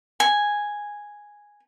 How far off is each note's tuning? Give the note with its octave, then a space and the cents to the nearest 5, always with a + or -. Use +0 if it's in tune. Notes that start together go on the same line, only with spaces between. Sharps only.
G#5 -5